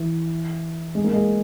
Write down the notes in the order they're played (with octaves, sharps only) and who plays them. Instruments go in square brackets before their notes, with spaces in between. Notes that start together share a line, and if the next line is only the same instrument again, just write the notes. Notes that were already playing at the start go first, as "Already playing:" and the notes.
Already playing: [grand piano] E3
G#3
A#3
G#3